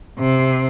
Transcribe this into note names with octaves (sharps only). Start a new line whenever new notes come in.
C3